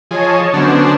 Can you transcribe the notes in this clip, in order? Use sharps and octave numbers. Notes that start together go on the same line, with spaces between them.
F3 G#4 C#5 D#5 A5
D3 F#3 B3 C#4 D4 C5